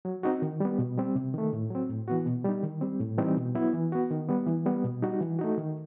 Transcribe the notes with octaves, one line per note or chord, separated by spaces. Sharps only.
F#3
C4 D#4 F#4
D#3
G3 B3
B2
G3 C4
C3
D#3 A3
A2
F#3 C4
A2
E3 B3 F#4
B2
G3 D#4
D#3
G3 C4
A2
E3 G3 C4 D#4
B2
F#3 B3 E4
E3
B3 F#4
D#3
G3 B3
E3
G3 B3
B2
G3 D#4 F#4
E3
A3 D#4 F#4
D#3